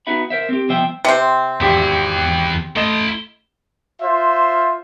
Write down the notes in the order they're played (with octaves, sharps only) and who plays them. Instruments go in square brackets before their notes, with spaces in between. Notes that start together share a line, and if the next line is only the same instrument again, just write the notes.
[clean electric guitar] B3 D#4 F#4 E5 B5
A#4 C5 E5
C4 G4
C2 B2 F3 C5 E5 G5
[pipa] C3 C4
[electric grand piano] G#1 G4 G5 [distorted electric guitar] E2 E4
[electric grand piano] A3 D#5 E7 [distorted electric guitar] E4 C6
[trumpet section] F4 C5 E5